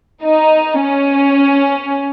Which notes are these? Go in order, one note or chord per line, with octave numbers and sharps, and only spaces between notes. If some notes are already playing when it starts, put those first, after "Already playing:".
D#4
C#4